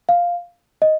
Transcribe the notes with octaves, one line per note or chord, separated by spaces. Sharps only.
F5
D#5